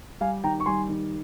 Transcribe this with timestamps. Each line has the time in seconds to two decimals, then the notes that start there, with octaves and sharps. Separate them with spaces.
0.21 G3 F5 G#5
0.44 D#3 G5 A#5
0.60 C#6
0.66 G3 G#5 C6
0.89 D#3